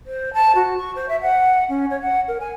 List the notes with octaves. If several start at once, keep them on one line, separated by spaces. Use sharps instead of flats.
C5
A5
F#4
C#6
C5
E5
F#5
C#4
C#5
F#5
A#4
G#5